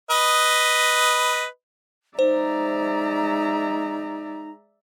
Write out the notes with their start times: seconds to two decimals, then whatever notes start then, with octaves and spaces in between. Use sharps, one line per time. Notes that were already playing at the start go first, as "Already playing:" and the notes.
0.10 B4 D#5
2.19 G#3 D#4 C5 D5 E5 A#5